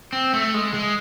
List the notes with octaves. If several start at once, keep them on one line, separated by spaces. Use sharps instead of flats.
C4
A3
G#3
G#3